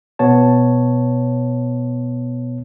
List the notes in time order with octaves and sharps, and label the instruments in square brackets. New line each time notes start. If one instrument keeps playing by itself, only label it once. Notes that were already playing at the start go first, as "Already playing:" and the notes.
[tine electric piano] B2 B3 C#5 A5